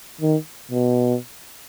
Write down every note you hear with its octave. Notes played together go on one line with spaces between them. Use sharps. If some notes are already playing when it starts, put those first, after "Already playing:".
D#3
B2